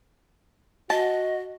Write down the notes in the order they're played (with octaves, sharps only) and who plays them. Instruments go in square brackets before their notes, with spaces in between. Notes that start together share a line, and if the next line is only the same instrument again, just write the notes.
[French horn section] F#4 [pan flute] D#5 [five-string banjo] A5